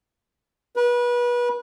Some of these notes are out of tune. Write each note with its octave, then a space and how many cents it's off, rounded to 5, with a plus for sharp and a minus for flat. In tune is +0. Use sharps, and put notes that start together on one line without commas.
B4 -30